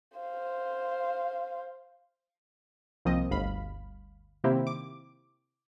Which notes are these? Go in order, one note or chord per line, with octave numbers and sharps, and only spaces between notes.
C5 F5
C2 F3 A#3 C4 D#5
G1 D2 F5 B5
C3 D#3 A#3 C4 E4 G4
D6